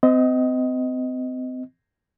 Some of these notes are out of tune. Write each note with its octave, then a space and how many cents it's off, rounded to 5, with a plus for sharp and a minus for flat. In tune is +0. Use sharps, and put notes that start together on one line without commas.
C4 -35 D#5 +10